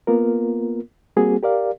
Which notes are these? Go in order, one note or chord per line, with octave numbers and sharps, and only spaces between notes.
A#3 B3 F4 A#4
G3 A#3 C4 F#4 G#4
G4 A#4 D5 F5